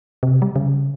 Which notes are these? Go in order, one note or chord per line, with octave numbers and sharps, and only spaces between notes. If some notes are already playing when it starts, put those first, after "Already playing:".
C3
G3
C#3